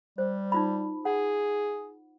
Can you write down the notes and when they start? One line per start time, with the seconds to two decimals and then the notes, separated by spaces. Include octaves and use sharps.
0.18 G3 C5
0.52 D#4 F4 B5
1.05 G#4 F#5